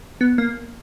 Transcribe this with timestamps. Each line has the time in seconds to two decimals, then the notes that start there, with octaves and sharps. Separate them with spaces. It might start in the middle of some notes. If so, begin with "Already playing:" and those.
0.21 B3
0.38 A#3